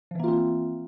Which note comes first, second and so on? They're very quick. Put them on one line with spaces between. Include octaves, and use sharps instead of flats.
F3 E3 A#3 F4 C4